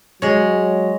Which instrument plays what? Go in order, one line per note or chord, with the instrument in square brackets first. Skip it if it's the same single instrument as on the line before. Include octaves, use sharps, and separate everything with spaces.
[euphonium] F#3 [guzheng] G#3 C#5